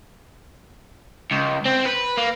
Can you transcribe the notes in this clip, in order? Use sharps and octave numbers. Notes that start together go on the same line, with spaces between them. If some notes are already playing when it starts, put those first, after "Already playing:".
C#2
C4
B4
A#3